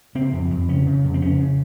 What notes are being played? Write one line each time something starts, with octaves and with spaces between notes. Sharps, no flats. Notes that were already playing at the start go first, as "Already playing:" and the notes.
C#3 C4
F2
F2
C#3 C#4
C#3
F2
C4
C#3 C#4
C#3